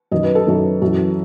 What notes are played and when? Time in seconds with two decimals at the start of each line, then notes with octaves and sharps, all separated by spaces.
0.12 F#2 D#3 D#5
0.23 B4
0.35 A4
0.47 F#2 D#3
0.82 F#2 E3